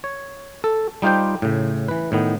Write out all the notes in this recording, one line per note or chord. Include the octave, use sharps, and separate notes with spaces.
C#5
A4
G3 D#4 F4 G4 C5 G5
A2 C#3
E3 B4
A2 D#3 B3